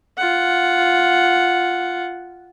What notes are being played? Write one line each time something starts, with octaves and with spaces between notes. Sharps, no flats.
F4 F#5